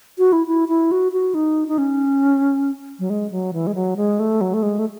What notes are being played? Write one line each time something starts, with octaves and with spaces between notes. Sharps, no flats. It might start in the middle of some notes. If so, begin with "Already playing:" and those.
F#4
E4
E4
E4
F#4
F#4
D#4
D#4
C#4
F#3
G#3
F#3
E3
G#3
F#3
G#3
A3
F#3
A3
G#3
A3